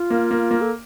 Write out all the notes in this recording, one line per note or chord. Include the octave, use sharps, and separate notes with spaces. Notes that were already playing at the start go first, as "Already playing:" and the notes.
Already playing: F4
A#3
A#3
A#3
A4